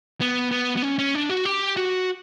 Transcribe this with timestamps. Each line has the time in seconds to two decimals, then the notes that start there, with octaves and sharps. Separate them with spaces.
0.21 B3
0.51 B3
0.77 B3
0.83 C#4
0.99 C#4
1.15 D4
1.30 F#4
1.45 G4
1.77 F#4